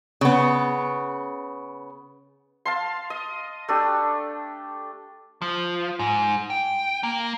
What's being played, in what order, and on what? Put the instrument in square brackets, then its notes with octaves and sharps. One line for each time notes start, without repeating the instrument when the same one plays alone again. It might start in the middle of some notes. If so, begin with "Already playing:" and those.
[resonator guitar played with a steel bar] C#3 B3
[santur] F5 A5 C6
D#5
A3 D4 G4
[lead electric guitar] F3
G#2
G5
A#3